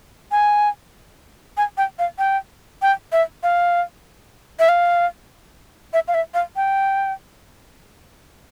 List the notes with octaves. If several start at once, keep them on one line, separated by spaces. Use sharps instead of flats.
G#5
G#5
G5
F5
G5
G5
E5
F5
E5
F5
E5
F5
E5
F5
G5